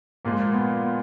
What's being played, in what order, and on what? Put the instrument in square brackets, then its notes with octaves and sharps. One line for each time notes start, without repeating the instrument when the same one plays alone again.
[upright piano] A#2 F3 G#3 [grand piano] A#3
[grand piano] B3